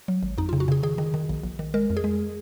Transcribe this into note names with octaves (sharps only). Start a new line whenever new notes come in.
F#3
G#1
F2 D#4
F4
C#3
F#4
C#3 G#4
D#3 G#4
D#3
D#3
A#1
A#1
D#3
G#3 A#4
F2
G#4
G#3